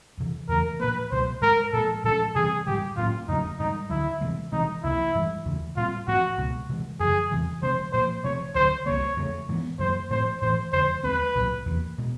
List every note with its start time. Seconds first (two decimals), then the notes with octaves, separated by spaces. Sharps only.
0.17 F2 C3 E3
0.49 E2 C#3 E3 A3 A#4
0.80 A#2 F3 A#3 B4
1.12 C#2 B2 F#3 A3 C5
1.41 G#2 D#3 G#3 A#4
1.73 A#2 F3 G#3 A4
2.04 A#2 F3 G#3 C#4 A4
2.35 C3 E3 G3 C4 G#4
2.67 G#2 D#3 G3 G4
2.97 A2 F#3 A#3 C#4 F4
3.28 F2 C#3 F#3 A3 D#4
3.59 G#2 D#3 G3 D#4
3.90 D2 D3 F#3 E4
4.21 C3 E3 G#3
4.52 C3 E3 G#3 C4 D#4
4.83 C#2 C3 F3 A#3 E4
5.15 G2 E3 G#3
5.45 D#2 C#3 E3 A3
5.77 A#2 G3 C4 F4
6.07 G#2 F3 A3 C4 F#4
6.38 C#2 B2 G#3 B3
6.69 C3 E3 G#3
7.00 F#2 C#3 F3 G#4
7.31 E2 C3 E3
7.62 C3 F3 G#3 C4 C5
7.93 A#2 F3 A#3 C5
8.24 C3 F3 A3 C#5
8.55 D2 D3 F#3 C5
8.86 C2 C3 F3 A#3 C#5
9.17 F2 C#3 F#3 A3
9.49 G#2 E3 G#3 B3
9.79 F#2 D#3 F#3 A#3 C5
10.10 A2 F3 A3 C4 C5
10.41 A2 E3 A3 C5
10.73 F2 D3 F3 G#3 C5
11.03 D#2 D#3 G#3 C4 B4
11.35 C2 A#2 F#3
11.66 E2 C3 F3 A#3
11.98 B2 G#3